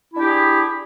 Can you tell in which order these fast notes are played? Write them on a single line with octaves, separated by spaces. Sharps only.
E4 D4 G4 G#4